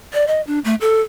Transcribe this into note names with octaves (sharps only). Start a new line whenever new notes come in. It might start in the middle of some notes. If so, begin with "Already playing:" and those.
D5
D#5
D4
A3
A4